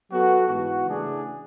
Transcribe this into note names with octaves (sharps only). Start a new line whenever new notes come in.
F#3 B3 F#4 A4
G#2 E3 B3 F#4
C#3 E3 A3 D4 G#4